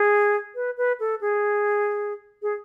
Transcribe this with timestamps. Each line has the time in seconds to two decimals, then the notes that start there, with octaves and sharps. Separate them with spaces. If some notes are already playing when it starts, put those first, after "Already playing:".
Already playing: G#4
0.55 B4
0.77 B4
1.00 A4
1.21 G#4
2.42 G#4